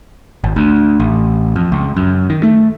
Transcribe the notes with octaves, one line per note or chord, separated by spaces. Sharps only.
G#1
D2
A1
F2
C#2
F#2
D#3
A3